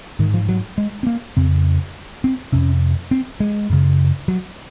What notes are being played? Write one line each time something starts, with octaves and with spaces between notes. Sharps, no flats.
G#2 D#3
F3
F#3
G#3
C4
A#3
F2 C#3 C4
C4
F2 C3 C#4
C4
G#3
F#2 C#3
F#3